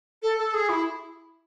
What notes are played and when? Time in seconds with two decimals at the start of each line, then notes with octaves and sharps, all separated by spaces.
0.23 A4
0.38 A4
0.54 G#4
0.69 E4